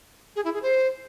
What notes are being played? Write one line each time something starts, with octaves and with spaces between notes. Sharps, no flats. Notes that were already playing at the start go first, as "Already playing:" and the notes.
G#4
E4
G#4
C5